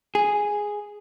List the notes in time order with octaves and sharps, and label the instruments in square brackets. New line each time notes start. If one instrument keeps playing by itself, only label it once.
[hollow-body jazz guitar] G#4